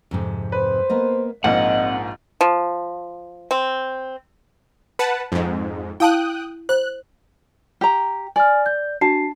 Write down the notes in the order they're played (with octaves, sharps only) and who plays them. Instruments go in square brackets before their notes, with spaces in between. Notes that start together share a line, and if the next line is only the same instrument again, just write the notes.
[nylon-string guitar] F2 G#2 C3
[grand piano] B4 [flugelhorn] C5
[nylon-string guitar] A#3 B3 D#5
[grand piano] A#1 G#2 A#3 [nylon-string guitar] C4 [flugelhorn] D#5 [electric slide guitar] F#5
[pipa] F3
C4
[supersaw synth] B4 F#5 A5
F2 G#2
[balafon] E4 F5 A5 [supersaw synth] G5 D#6 F#6
[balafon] C5 [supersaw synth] F#6
[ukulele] G4 A#5
[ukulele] D5 [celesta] G#5 F6
[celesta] G6
[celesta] D4 F#4 C7 [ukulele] A5